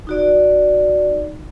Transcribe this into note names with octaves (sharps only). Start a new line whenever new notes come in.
D#4 F#4 D5